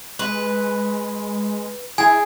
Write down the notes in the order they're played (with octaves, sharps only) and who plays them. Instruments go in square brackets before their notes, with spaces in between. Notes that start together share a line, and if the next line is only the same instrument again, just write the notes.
[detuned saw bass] G#3 [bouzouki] B4
[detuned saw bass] E4 [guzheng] G#4 [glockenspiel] G#5